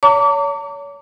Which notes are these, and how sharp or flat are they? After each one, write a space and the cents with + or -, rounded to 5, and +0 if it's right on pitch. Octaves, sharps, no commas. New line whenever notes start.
C#5 +35 A#5 -45 D6 -35